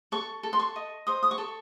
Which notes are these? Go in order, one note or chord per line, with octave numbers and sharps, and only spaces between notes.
A4 C#6
A4
C6
C#6
D#5
C5 D#6
D#6
C#6
A4